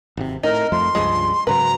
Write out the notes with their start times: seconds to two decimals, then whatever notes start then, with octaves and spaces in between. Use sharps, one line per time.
0.17 G#1 C3
0.43 A2 D#4 A#4
0.72 F2 F3 A3 C6
0.95 C#2 G2 F3 G#3
1.47 G#2 C#3 F#3 B4 A#5